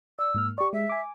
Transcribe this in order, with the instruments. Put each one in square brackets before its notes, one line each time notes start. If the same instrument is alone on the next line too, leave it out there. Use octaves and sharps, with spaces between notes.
[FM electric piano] D5 [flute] E6
[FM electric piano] G#2 A#3 F6
[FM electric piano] G4 D5 [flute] C#6
[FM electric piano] G#3 [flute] E5
[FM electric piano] G#5 D6